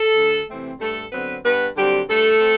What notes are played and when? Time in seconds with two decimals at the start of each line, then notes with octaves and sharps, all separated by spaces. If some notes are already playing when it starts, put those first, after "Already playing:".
Already playing: A4
0.16 D2
0.48 C3 E3 A3 C4
0.80 G2 A3 A4
1.12 D3 F#3 B3 C4 B4
1.44 G2 B3 B4
1.76 D3 F#3 G3 C4 G4
2.08 G2 A3 A4
2.41 C4